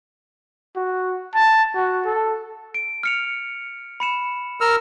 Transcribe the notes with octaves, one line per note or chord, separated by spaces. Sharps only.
F#4
A5
F#4
A4
D7
F6 C#7 F7
B5 C#7 E7
A#4 E6 F6